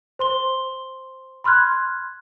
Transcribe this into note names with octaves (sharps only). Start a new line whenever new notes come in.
C5 C6 G7
B5 C6 F6 F#6 G#6